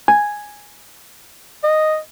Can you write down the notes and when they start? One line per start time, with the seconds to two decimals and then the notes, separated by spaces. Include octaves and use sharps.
0.08 G#5
1.63 D#5